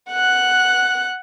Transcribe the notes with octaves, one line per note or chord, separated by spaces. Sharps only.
F#5 F#6